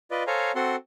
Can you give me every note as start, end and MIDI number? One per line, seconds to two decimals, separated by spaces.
0.11 0.23 65
0.11 0.23 71
0.11 0.23 74
0.11 0.23 75
0.27 0.52 69
0.27 0.52 72
0.27 0.52 73
0.27 0.52 77
0.27 0.52 80
0.27 0.52 82
0.55 0.76 60
0.55 0.76 66
0.55 0.76 69
0.55 0.76 78
0.55 0.76 84